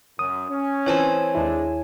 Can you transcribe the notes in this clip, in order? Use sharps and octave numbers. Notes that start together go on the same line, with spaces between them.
F#2 D#6
C#4
E3 C4 C#5 G#5 A5
D#2 G#3 D4 E4 A4